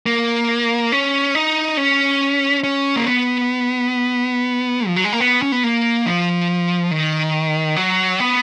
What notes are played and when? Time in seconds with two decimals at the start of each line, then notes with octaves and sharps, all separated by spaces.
0.06 A#3
0.92 C#4
1.35 D#4
1.77 C#4
2.64 C#4
2.96 A#3
3.06 B3
4.87 F3
4.96 F#3
5.04 G#3
5.13 A#3
5.20 B3
5.42 C#4
5.52 B3
5.64 A#3
6.06 F3
6.91 D#3
7.76 F#3
8.20 B3